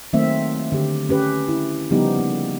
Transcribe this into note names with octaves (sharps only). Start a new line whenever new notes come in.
D#3 F#3 A3 A#3 C4 E5
D3 G4
C#4 G4 B4
E4
C#3 F3 G3 B3 D#4 G4
A#3